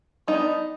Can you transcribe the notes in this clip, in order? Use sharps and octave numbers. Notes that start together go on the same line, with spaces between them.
G3 B3 D4 D#4